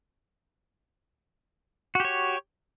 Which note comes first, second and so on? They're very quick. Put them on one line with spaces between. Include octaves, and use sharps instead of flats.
F#4 G4 C#5